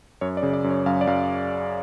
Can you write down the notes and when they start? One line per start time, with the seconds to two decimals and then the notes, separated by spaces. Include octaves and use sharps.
0.21 F#2 C#5
0.37 D5
0.43 C#3
0.53 D5
0.64 F#2
0.70 C#5
0.86 F#2 F5
1.01 D5
1.07 F#2 F5